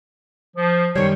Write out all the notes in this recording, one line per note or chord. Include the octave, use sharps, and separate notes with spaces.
F3
F#2 D#3 G3 C5 C#5